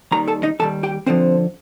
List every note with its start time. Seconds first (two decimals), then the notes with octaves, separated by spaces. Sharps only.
0.12 D#2 D#3 G3 A#4 A#5
0.28 A4 A5
0.43 D#4 D#5
0.59 D#2 D#3 G3 A4 A5
0.83 G4 G5
1.06 D2 D3 F3 C4 C5